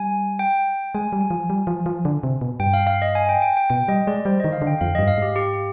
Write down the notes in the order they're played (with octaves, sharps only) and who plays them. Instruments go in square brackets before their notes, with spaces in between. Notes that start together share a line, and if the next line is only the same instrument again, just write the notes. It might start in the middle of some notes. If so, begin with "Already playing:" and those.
Already playing: [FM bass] G3 [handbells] G#5
[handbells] G5
[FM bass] G#3 [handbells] G#5
[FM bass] G3
[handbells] G#5
[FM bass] F3
G3
F3
F3
D3
C3
B2
[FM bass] G2 [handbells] G5
[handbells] F5
F5
D#5
G#5
G5
G5
G5
[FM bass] B2 [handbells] G5
[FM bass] G3 [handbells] D#5
[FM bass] G#3 [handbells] D5
[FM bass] G3 [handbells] C5
[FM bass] D#3 [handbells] D#5
[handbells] F5
[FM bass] D3
[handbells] G5
[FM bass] F2 [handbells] F5
[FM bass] G2 [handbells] D#5
[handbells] F5
[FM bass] G#2 [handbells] G4
[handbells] G4